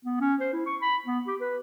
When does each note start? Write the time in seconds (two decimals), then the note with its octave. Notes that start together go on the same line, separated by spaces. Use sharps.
0.05 B3
0.21 C#4
0.40 C5
0.53 E4
0.66 C#6
0.82 B5
1.06 B3
1.27 G4
1.41 B4